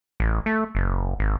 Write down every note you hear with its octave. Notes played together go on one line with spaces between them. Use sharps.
A1
A3
F#1
G#1